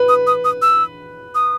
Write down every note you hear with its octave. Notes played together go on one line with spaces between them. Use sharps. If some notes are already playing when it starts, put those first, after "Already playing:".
Already playing: B4
D#6
D#6
D#6
E6
D#6